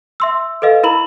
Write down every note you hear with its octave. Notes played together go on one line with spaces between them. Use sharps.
E5 C6 E6
A4 B4 D#5 F5
E4 A#4 A#5 B5 F#7